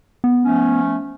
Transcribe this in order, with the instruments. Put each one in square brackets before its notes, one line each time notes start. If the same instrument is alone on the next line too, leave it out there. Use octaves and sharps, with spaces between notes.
[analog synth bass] B3
[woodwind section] F3 A3 C#4